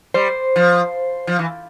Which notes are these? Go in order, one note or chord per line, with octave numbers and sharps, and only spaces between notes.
G3 C5
F3
F3
E3